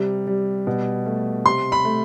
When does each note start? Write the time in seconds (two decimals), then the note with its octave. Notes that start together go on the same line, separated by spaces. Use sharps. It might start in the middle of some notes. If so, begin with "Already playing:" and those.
Already playing: C3 G3
0.27 G3
0.67 B2
1.06 A3
1.46 C3 C6
1.72 B5
1.85 A3